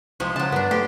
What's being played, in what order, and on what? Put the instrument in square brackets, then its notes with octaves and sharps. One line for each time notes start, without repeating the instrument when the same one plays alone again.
[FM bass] C2 [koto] C3 F3 G#3
[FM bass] C#3 [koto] F#3 A5
[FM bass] G2 [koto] B3 D4
[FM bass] A3 [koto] C4 G4